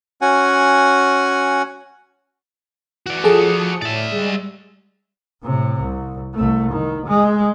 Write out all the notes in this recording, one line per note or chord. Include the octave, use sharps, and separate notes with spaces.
C#4 F#4 F#5 G#5
E3 F#4 D5 C#7
F3 G#4 A4 A5 D#6 C#7
A2 D5 E5
G3 G#3
A2 C3
C2
C2 A3
D#3
G#3